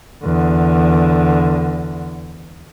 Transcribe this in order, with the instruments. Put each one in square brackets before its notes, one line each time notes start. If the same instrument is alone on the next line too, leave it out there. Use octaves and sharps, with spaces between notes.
[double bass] E2 D3